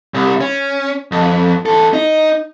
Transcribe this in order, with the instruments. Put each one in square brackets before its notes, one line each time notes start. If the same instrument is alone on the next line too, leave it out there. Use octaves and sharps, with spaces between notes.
[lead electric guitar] C2
C#4
F2
E2 A4
D#4